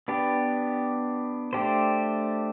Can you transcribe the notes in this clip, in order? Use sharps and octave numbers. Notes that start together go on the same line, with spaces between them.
B3 D4 G4
A3 D4 G4 C5